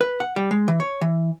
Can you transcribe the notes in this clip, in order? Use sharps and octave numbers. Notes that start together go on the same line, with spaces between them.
B4
F#5
G3
G#3
E3
C#5
E3